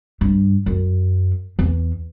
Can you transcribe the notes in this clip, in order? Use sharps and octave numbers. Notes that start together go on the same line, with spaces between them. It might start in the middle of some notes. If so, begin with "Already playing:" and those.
G2
F#2
E2